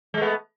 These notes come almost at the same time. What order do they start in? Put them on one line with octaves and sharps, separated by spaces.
G#3 A3 B3